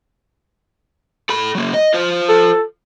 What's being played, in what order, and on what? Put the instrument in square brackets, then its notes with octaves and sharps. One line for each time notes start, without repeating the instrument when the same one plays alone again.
[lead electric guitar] A4 B5
F#3 A#3
D#5
F4 C5
[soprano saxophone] A4